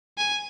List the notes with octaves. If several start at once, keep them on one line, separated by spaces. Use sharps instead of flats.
G#5